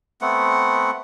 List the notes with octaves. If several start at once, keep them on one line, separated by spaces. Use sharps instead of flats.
A3 B3 C4 F#5